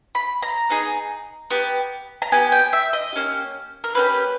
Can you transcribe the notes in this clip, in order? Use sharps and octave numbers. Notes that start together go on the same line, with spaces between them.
B5
A#5
B3 D#4 G#4
B3 G4
A#5
B3 G4 G#5
G5
E5
D#5
A#3 C#4 G4
A#4
A#3 C#4 G4 B4